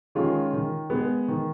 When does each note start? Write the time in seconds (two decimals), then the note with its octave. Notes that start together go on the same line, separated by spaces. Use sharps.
0.15 D#3 G#3 C#4 F4
0.53 D#3
0.90 G#3 B3
1.28 D#3